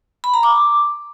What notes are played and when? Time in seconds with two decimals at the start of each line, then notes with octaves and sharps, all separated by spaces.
0.24 B5
0.34 A#5
0.43 D6